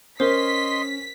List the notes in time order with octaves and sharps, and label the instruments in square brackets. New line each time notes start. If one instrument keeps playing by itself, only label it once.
[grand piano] C#4 [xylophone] A#4 C5 [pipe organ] D#5 C6 [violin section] B6